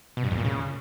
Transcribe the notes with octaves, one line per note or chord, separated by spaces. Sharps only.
B2
G2
E2
A#2
C#3